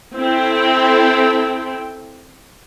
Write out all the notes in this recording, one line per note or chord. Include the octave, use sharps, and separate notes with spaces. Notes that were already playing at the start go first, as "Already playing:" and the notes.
C4 E4 A4 G5